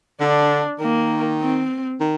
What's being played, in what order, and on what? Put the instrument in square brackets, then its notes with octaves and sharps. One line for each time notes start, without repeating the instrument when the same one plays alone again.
[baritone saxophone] D3 [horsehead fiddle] D4
[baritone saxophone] D#3 [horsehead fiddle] A#3
[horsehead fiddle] C4
[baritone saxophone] D#3